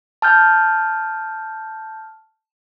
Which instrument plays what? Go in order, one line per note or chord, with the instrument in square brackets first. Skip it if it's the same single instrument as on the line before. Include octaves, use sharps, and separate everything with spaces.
[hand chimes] A5 F6 G6